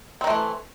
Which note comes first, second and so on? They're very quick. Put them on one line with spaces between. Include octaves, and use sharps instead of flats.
C4 D#3 A3 E3